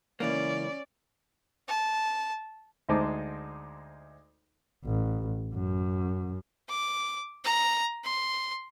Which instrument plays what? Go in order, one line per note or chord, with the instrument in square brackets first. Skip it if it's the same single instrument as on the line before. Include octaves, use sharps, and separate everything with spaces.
[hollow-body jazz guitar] C#2 E3 A#3 [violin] C#4 D5
[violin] A5
[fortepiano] D2 G#3 D#4 C5 A5 D6
[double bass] A1
F#2
[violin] D6
A#5
C6